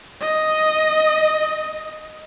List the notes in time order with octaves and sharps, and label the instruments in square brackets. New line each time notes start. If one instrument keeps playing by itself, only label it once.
[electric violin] D#5